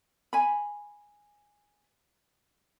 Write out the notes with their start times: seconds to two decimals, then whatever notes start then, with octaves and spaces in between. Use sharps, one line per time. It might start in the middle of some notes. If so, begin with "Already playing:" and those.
0.33 G#5 B5